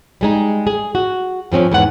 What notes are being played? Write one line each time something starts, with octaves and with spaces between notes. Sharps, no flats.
G3 G#3 D#4
G#4
F#4
G2 F3 C4 C#4
E2 G#2 B3 F#5